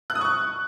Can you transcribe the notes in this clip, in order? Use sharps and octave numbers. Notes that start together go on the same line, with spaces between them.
F#6
D#6
C#6